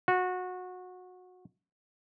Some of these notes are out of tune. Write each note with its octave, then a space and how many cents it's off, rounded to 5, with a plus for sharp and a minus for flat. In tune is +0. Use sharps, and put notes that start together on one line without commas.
F#4 -20